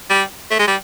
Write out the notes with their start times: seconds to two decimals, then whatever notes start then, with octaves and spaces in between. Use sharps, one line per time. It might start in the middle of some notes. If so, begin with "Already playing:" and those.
0.10 G3
0.51 A3
0.60 G#3
0.68 G3